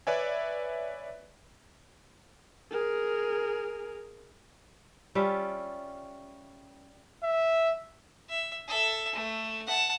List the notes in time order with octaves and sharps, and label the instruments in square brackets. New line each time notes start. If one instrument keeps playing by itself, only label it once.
[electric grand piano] B4 C#5 D5 E5 G#5
[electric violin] G#4 A#4
[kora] G3 C#4 F4 E5
[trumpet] E5
[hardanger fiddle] E5
A4 E5
A3
F#5 A5